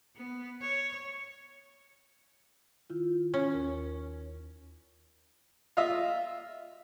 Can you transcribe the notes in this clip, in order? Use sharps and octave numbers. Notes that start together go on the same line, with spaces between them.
B3
C#5
D#3 E4 F4
C#4
D#2 A#4
F4 D#5 E5